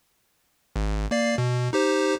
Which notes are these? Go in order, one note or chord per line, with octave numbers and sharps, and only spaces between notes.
G#1
A#3 D5 C7
B2
D#4 G4 C5